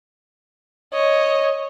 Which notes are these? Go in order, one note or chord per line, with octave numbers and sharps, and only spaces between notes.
C#5 D#5